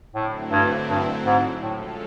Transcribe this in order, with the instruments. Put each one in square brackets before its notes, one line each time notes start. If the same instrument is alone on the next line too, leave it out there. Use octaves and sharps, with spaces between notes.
[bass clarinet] A2 [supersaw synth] D3 F#3 A3 C4 E4
[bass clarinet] G2
G2
G#2
[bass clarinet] A2 [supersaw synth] F3 G#3 C#4 F4 A4